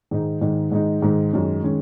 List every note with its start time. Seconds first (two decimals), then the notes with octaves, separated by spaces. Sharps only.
0.11 G#2 D#3 G#3 D#4
0.41 G#2 D#3 G#3 D#4
0.71 G#2 D#3 G#3 D#4
1.02 G#2 D#3 G#3 D#4
1.33 F#2 D#3 G#3 C#4
1.63 D#3 G#3 C#4